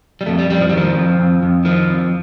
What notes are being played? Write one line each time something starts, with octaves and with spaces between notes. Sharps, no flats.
G3
F2 A3
G3
F2 G3
F3
G3
D#3 F3
F2
F2
F2
D#3 F3
F2